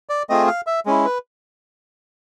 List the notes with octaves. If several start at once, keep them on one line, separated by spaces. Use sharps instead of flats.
D5
A3 C4 F4 G#4 D#5
F5
E5
G#3 C#4 E4
B4